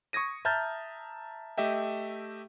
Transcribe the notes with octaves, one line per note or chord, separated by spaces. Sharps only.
C#6 D#6 G#6 A#6 D#7
E5 A5 A#5 F6 G6 A6
A3 G4 D#5 E5 G5